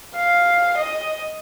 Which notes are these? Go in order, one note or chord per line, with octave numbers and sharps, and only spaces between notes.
F5
D#5